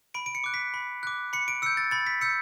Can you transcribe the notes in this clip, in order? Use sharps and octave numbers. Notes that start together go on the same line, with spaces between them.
B5 D7
D7
C#7
D6 F#6
B6
B5
D6 F#6
B5 C#7
D7
E6 G6 C#7
A6
B5 A6
B6
E6 G6 C#7